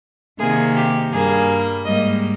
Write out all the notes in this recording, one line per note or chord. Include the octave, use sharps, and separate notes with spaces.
C3 D#3 A#3 G#4
G4
G2 G3 A#3 G#4
G#2 G3 A#3 D#5